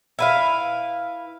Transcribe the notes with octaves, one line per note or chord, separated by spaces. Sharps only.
E4 B4 F5